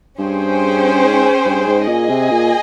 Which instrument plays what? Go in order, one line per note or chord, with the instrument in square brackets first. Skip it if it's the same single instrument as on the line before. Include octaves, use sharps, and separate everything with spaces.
[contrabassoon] G2 [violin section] C#4 G#4 C5 G5
[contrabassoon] G#2
G2
G#2
[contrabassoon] A#2 [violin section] G#4 D#5 G#5
[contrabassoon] C3
A#2